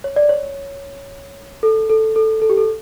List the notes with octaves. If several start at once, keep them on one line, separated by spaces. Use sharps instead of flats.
C#5
D5
C#5
A4
A4
A4
A4
G4
A4